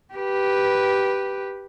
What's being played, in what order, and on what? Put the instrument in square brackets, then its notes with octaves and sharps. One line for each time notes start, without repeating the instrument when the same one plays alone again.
[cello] G4 B4